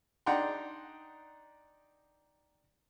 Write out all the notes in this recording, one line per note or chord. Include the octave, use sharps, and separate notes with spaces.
D4 D#4 F#5 G5 A#5 C6